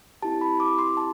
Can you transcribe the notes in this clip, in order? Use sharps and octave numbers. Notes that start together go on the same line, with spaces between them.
C4 E4 G4 A5
B5
D6
C6
A5